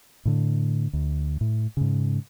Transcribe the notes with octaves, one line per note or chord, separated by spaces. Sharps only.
A2 D3
D2
A2
G#2 C#3